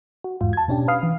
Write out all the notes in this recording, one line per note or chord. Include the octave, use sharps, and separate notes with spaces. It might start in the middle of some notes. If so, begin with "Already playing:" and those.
F#4
E2 G#2 F4
A5 G#6
B2 C#4 D4 G4
B4 F5 D#6 F6 C7
E3